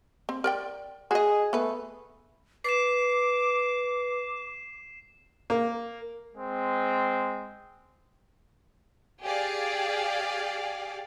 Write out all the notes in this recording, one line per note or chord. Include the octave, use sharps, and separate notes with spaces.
C4
A#4 D5 G5
F#4 G#4 D#5
A3 B3 B4
B4 D6 C7 E7
A#3
G#3 C4
G4 G#4 D5 F5